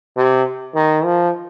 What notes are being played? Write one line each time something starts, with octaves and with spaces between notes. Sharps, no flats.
C3
D#3
F3